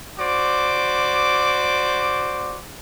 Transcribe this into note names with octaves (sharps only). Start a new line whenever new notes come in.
F#4 C5 D5 D6